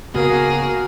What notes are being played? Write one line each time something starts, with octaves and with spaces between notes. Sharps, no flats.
C#3 A#3 B3 F#4 G#4 D#6 F6